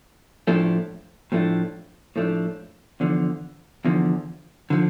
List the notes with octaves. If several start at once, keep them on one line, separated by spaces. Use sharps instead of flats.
A2 F3 A3 D4
A2 F3 A3 D4
A2 F3 A3 D4
E2 D3 F3
E2 D3 F3
D3 F3